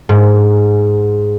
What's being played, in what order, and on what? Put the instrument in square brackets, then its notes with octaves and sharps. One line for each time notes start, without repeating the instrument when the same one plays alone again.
[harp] G#2